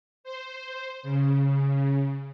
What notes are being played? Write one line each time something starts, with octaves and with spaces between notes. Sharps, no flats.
C5
C#3